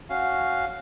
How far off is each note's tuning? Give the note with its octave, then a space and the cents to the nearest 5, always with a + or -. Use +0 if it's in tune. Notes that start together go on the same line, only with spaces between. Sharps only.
C#4 +0 F#4 +0 F5 +0